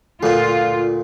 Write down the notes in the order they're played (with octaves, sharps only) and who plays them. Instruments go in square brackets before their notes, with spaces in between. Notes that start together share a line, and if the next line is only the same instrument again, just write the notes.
[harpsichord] D2 A#2 [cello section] F4